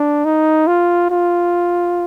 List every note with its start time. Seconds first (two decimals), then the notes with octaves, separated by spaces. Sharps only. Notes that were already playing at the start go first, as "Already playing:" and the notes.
Already playing: D4
0.25 D#4
0.67 F4
1.11 F4